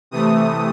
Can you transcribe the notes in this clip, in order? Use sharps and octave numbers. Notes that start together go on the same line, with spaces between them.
C3 E3 A3 D#6